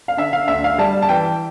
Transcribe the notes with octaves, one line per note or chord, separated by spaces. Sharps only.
F5
D3 E5
F5
D2 E5
F5
G3 A5
A5
E3 G5